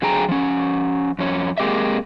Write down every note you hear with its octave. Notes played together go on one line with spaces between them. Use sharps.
D3 F#3 G#4 G5 A#5
F3 C#4
F2 C#4
G#3 A#3 C4 G4 D#5 E5